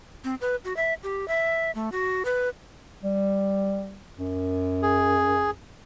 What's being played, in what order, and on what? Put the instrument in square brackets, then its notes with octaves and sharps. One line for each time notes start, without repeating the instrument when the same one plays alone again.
[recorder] C4
B4
F#4
E5
G4
E5
A3
F#4
B4
[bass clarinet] G3
F#2
[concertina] G#4